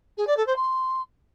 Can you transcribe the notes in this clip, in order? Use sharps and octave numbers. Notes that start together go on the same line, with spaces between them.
G#4
D5
A4
C5
C6